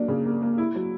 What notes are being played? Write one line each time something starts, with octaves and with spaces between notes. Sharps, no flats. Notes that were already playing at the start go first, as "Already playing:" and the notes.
Already playing: F#3 A#3 D4
C#3
A#3
A#3
E4
F#3